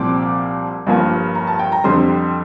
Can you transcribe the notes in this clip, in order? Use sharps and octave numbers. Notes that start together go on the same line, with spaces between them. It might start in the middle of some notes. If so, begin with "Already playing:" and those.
Already playing: C2 A#2 F3 C4 D6
G1 G2 F3 A#3
A#5
A5
G5
A#5
F2 D3 G3 C4 C6